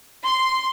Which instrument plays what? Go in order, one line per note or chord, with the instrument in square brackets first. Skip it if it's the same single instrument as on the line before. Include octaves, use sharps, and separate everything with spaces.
[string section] C6